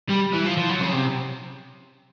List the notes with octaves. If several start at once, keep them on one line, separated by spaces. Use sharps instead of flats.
G3
E3
F3
F3
F#3
C#3
C3